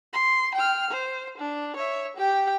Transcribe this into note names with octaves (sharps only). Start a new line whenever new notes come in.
C6
G5 F6
C5
D4
C#5 E5
G4 G5